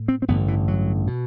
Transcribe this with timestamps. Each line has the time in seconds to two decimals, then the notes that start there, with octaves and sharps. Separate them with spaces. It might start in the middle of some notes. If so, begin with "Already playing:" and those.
Already playing: A2
0.08 C4
0.22 C4
0.28 A1 G2 D3 B3
0.48 E3
0.68 F#3
1.07 B2